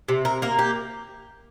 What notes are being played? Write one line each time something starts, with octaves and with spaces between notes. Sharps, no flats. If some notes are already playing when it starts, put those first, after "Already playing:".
C3
A#4
A#3 A#4
G4